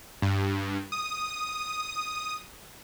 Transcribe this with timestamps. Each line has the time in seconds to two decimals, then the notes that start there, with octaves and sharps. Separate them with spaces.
0.22 G2
0.92 D#6